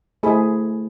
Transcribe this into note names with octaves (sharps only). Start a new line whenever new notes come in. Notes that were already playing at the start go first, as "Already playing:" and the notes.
A3 E4 G#4 C5 B5